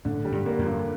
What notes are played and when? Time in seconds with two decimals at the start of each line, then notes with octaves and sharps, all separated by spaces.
0.05 A2 D3
0.25 G3
0.32 G2
0.46 A#3
0.59 F2
0.66 G2